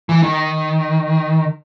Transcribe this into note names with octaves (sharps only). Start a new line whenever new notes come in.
E3
D#3